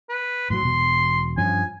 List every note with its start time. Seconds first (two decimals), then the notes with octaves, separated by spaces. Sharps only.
0.09 B4
0.50 A2 F#3 C6
0.63 E1 B2
1.37 G2 F3 C#4 G#5